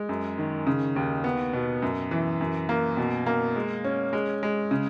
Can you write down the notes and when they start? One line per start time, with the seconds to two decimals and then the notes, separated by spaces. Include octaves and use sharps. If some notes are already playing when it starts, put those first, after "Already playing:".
Already playing: G#3
0.09 F#2
0.38 D#3
0.67 C#3
0.96 D#2
1.24 B3
1.54 B2
1.82 F#2
2.11 E3
2.41 F#2
2.69 A#3
2.97 B2
3.26 A#3
3.55 G#3
3.84 C#4
4.13 G#3
4.43 G#3
4.71 C#3